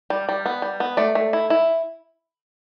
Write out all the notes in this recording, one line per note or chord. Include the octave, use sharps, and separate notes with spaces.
G3
G3
B3
G3
B3
A3 D5
A3
E4
E4